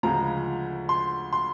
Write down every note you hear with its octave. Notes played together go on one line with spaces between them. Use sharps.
D2 C#3 F3 G#3 A#5
C6
C6